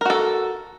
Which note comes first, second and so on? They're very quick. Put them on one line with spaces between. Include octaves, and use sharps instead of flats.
A#4 F#4 A4